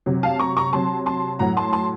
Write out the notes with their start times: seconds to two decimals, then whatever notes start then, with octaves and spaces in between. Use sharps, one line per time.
0.06 C3 F#3
0.23 F5 A5
0.39 A#5 C#6
0.57 A#5 C#6
0.73 C3 F#3 A5 C6
1.06 A5 C6
1.39 A2 F#3 F#5 A#5
1.57 A5 C6
1.73 A5 C6